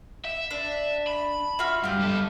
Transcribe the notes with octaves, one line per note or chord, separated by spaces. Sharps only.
E5
D4
B5
F4 F#4 E5
G2 G4 F5
G2 A4